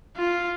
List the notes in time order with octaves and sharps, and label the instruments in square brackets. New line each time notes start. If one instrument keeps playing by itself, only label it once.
[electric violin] F4